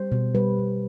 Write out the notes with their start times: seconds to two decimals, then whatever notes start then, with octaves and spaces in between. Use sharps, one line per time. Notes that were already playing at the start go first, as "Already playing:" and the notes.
Already playing: G3 C5
0.12 B2
0.35 G3 B4
0.59 B2